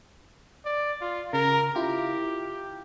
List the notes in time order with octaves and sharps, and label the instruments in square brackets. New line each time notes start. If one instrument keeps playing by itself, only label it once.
[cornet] D5
F4
[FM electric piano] C#3 [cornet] A#4
[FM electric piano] E4 F4 [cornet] G4